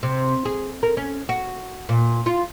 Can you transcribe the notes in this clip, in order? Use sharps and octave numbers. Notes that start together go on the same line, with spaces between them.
C3
G#4
A#4
C#4
F#4
A#2
F4